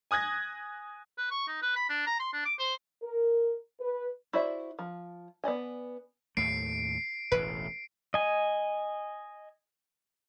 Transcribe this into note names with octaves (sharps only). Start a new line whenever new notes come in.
G#5 D#6 F#6 G#6 A#6
B4
C#6
D#4
B4
B5
D4
A#5
C6
D4
D6
C5
A#4
B4
E4 F#4 C5 D5 E5
F3
B3 D5 D#5 G#5
D#2 A2 A3 C7 D7
E1 A1 A2 B4
D#5 G#5